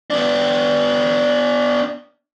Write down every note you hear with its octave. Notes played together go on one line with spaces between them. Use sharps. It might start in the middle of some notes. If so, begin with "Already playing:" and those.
B3 D4